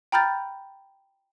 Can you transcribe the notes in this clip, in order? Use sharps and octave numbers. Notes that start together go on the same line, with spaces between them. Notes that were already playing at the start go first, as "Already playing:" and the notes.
G5 A#5 B5 F6 G6 A6